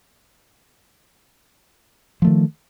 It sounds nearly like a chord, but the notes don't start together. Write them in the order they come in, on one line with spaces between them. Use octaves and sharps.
F3 A3 D#3